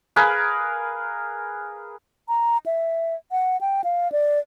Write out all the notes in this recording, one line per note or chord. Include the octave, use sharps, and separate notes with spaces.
G#4 A#4 B4 F5
A#5
E5
F#5
G5
F5
D5